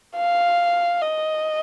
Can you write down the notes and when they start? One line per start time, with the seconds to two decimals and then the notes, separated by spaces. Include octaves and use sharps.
0.17 F5
1.02 D#5